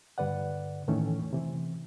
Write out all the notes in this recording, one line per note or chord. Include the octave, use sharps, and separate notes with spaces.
G2 D3 B4 D5 F#5
F2 A2 D#3 E3 A3 C#4
C3 E3